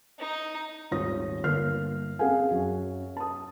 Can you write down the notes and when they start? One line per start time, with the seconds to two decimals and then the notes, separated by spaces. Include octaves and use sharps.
0.19 D#4
0.91 D#1 G#1 F4 C#5 D#6 A#6
1.44 G1 A#3 F6 C7
2.19 C4 C#4 G#4 F5 F#5 G#5
2.51 F#2 F#3
3.17 A5 D#6